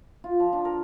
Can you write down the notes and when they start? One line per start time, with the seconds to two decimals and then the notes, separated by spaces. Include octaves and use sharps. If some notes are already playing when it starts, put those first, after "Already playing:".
0.24 F4
0.40 F3
0.53 D4
0.65 A#4